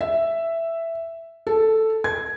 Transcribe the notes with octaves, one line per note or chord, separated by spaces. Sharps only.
E5
A4
G#6